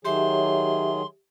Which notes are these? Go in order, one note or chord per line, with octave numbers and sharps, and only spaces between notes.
D#3 F#3 G4 G#4 C#5 E5 C6